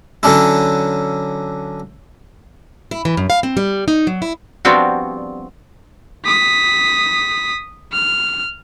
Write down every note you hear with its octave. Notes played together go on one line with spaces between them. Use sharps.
D3 F#3 C#4 D4 E4
E4
E3
F#2
F5
C4
G3
D#4
F#3
E4
F3 G3 B3 C4 D4 F#4
D#6 B6
F6